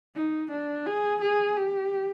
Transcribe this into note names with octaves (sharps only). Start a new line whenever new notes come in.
D#4
D4
G#4
G#4
G4